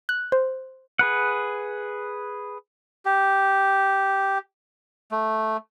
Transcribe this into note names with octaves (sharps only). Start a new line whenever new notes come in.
F#6
C5
G#4 B4 F#5
G4
A3